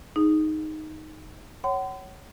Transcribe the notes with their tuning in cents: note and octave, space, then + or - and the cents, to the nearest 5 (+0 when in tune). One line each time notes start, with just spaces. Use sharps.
D#4 +0 G#4 +0
C#5 -5 F#5 +40 C6 -45